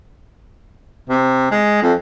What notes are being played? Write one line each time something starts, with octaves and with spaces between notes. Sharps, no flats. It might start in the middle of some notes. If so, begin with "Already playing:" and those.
C3
G#3
F2